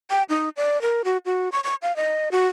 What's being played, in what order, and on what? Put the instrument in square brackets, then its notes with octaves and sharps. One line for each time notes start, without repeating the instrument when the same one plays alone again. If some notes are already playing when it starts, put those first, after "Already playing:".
[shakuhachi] G5
D#4
D5
A#4
F#4
F#4
C#6
C#6
F5
D#5
F#4